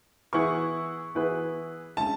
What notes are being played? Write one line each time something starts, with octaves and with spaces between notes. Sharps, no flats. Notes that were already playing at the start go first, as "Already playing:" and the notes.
E3 B3 E4 G#4 B4 C#6
E3 B3 E4 G#4 B4
D3 G#3 C#4 E4 A5